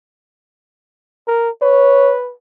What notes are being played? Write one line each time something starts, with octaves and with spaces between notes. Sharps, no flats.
A#4
B4 C#5